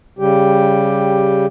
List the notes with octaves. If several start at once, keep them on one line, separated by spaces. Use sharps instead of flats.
C#3 G3 G4